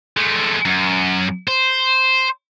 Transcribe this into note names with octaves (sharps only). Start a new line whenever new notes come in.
G#3 A3
F#2
C5